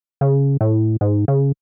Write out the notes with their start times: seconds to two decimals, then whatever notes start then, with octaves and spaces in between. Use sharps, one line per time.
0.21 C#3
0.61 A2
1.01 G#2
1.28 C#3